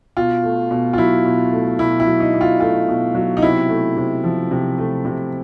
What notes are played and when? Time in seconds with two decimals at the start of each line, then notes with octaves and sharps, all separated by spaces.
0.17 B2 F4
0.44 A3
0.71 B2
0.93 F4
0.98 F#3 E4
1.25 B2
1.53 A3
1.79 B2 E4
2.00 E4
2.06 F#3
2.20 D#4
2.34 B2
2.41 F4
2.60 A3 F4
2.89 B2
3.15 F#3
3.37 D#4
3.42 C3 E4
3.69 A3
3.97 C3
4.24 F3
4.51 C3
4.78 A3
5.05 C3